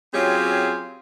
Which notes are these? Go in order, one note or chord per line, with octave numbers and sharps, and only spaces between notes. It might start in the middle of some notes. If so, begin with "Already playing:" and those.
F#3 C4 C#4 F4 G4 G#4